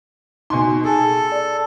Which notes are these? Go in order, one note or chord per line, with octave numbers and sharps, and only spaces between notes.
B2 D#4 G#5 C6
G#4 A4
D5